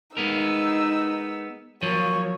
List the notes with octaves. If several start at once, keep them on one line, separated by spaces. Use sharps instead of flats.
G#3 B3 D#4 A#4 E6
F3 F#3 A#3 C#5